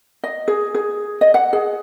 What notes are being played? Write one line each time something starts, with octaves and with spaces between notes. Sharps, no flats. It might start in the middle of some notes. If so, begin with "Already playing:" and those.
D#5
G#4
G#4
D#5
F#5
G#4